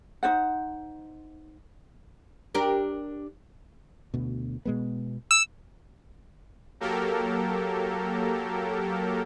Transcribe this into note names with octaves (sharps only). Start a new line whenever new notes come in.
D#4 F4 C5 F#5
D4 G4 A#4
D2 B2
B2 G#3 B3
E6
F#3 A#3 G4 A4 A#4